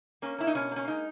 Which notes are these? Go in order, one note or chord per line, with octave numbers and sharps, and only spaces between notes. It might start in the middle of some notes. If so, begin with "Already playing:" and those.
A#3 C#4
A#3 E4
D#4
B2 C#4
A#3 C#4
G#3 D#4